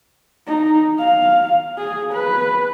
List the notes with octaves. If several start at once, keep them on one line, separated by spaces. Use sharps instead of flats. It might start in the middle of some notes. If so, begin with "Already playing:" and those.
D#4
F5
G#4
B4